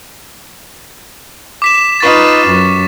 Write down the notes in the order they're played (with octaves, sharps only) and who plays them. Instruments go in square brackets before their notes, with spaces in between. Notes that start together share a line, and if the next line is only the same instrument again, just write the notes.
[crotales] D6 B6 E7
[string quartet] D#4 F4 B4 [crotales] C#6 A6
[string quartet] F#2